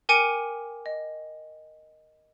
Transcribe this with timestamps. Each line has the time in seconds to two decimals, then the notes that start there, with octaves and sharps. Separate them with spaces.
0.09 A#4 G5 G#5 D6 C#7 D#7
0.86 D#5